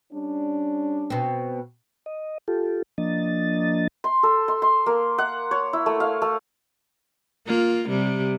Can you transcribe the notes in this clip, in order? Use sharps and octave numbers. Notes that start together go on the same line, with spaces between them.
G3 C#4 D4
B2 C4
D#5
F4 G4 A4
F3 A#3 D4 D#5 A6
C6
A4
C6
C6
A#3
F#5
C#5
E4
A3
F5
A3
A#3 F4
C3 G3